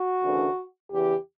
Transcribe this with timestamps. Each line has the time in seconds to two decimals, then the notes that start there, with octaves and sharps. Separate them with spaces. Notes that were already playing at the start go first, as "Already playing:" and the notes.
Already playing: F#4
0.23 D2 C#3 E3 A3 D4
0.90 E2 C#3 E3 G4